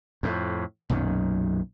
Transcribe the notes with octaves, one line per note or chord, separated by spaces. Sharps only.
F2 A2
B1 F#2 A#2 D#3